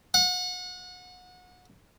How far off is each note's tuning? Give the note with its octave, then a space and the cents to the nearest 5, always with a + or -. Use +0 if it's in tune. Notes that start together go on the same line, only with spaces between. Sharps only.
F#5 -30